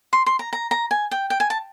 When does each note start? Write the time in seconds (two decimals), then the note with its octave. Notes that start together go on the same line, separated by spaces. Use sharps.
0.13 C6
0.26 C6
0.39 A#5
0.53 A#5
0.71 A#5
0.91 G#5
1.11 G5
1.30 G5
1.40 G#5
1.50 A5